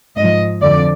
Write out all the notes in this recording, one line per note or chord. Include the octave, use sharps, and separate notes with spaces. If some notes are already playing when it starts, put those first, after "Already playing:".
G#2 F3 D#5
F2 D3 F3 D5